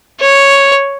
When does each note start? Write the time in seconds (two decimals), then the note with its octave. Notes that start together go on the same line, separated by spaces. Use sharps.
0.20 C#5